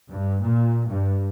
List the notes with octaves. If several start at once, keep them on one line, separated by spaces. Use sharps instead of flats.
G2
A#2
G2